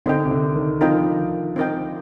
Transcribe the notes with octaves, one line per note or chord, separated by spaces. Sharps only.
D3 C4 D#4 A#4 D#5 G5
C3
D3
D#3
F3 C4 D#4 A#4 D#5 G5
D#3
C4 D#4 A#4 D#5 G5